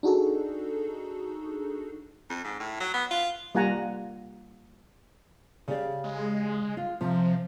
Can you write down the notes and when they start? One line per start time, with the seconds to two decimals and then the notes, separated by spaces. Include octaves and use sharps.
0.03 D4 D#4 F#4 G#4 A4
2.30 F2
2.44 G#2
2.60 A2
2.80 F#3
2.94 B3
3.11 F4
3.55 G3 A#3 F4 F#5 G#5 A#5
5.68 C#3 G4 D5
6.04 G#3
6.77 F4
7.01 C3 F3